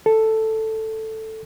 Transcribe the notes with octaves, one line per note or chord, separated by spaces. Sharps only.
A4